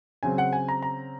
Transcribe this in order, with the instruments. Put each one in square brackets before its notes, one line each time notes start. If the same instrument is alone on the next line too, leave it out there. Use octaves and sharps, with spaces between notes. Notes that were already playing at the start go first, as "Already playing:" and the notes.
[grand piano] C#3 F#3 C4 G#5
F#5
G#5
A#5
A#5